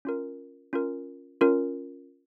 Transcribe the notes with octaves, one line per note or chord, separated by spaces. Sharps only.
C#4 F4 A#4
C#4 F4 A#4
C#4 F4 A#4